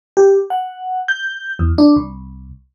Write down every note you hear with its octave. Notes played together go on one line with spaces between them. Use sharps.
G4
F#5
G6
E2
D4
C2